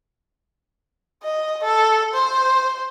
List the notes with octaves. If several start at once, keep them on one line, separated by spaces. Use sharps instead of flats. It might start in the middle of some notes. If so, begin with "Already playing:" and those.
D#5
A4
C5